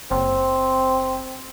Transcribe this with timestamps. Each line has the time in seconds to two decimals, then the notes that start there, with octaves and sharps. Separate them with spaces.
0.11 F#1 C4